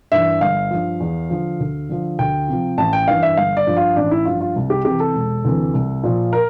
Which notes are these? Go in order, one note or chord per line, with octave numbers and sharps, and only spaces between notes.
G2 E3 E5
G1 F5
G2 F3
E2
D3 F3
D2
D3 F3
D2 G5
C3 F3
A1 A5
G5
G2 E3 F5
E5
G1 F5
D5
G2 F3
F4
A1 D4
E4
G2 F3 F4
F4
C2
G4
C3 E3 G4
A4
E1
D2 C3 E3
C2
A#2 F3
A#4